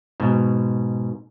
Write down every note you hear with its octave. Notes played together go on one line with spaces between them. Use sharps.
G#2 B2